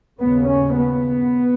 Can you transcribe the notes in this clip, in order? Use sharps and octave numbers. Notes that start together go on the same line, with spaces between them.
D#2 C#3 B3
C#4
B3